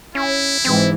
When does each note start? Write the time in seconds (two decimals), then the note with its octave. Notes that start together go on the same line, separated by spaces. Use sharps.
0.15 C#4 E4
0.65 G#2 E3 C4